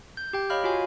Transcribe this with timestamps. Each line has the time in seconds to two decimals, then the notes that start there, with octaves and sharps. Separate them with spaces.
0.17 G6
0.33 G4 G5
0.50 C#5 D#5 F5 B5 F6
0.64 F4 F#4 C#5 G#5